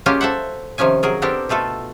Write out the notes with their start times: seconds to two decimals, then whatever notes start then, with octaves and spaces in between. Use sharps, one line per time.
0.06 F#3 G#3 A#3 C#4 F4 G4
0.21 A4 C5 E5 F#5
0.78 C3 D#3 F3 C#4 G#5
1.03 F#3 G#4 A#4
1.22 B3 C4 D4 G4 A4 A#4
1.49 B2 A3 F4 A4